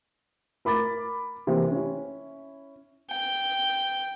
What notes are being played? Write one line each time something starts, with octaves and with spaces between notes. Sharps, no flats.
A#4 B5 D6 A6
C3 E3 A#3 C4 G4
C#4 E4
G5